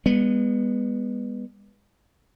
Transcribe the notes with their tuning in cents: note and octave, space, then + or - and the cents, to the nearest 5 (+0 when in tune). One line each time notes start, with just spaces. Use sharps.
G#3 -40 B3 -10